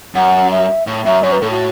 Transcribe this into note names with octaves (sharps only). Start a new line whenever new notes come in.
F#2 F#5
E5
A2
F#2 E5
F#2 C#5
B4
A2 A4
F#4